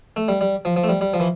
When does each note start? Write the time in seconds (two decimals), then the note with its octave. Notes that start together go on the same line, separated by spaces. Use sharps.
0.16 A3
0.28 G3
0.41 G3
0.65 F3
0.76 F3
0.84 A3
0.89 G3
1.01 G3
1.14 F3
1.20 E3